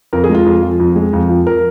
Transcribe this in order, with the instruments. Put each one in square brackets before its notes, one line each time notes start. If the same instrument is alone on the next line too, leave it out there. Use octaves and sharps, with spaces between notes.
[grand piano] F2 A#4
G#4
G#3 F4
F2
F3
F2
G#3
F2
F3
A#4